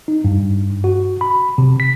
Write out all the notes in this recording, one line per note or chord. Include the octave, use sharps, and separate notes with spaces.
D#4
G2
F#4
B5
C3
B6